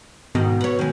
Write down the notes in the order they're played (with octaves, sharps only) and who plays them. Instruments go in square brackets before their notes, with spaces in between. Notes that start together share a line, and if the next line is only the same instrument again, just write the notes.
[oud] G#2 D#3 [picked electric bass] B2
[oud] B4 C#5
D#3 G#3